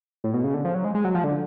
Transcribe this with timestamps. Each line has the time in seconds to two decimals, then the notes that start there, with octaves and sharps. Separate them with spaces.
0.24 A2
0.34 B2
0.44 C#3
0.54 D3
0.65 F3
0.74 F#3
0.84 G#3
0.95 G#3
1.04 F#3
1.15 F3
1.24 D3